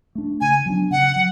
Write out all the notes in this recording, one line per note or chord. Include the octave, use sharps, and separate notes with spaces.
A3 D4
C#3 G#5
F#3 B3 D4
C#3 F#5
F#3